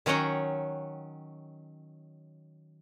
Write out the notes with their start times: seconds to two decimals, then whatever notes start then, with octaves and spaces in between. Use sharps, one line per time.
0.06 D#3 F#3 C#4 D#5 F#5 G5